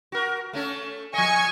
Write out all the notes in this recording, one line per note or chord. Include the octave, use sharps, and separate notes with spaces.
F#4 A#4
A3 C#4 A4
F3 D#5 G#5 C#6 G#6